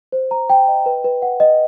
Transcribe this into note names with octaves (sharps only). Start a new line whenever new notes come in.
C5
A#5
G5
D#5
B4
B4
F#5
D#5